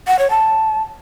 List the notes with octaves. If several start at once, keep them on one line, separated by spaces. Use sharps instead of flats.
F#5
C#5
A5